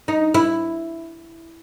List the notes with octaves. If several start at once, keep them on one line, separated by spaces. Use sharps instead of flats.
D#4
E4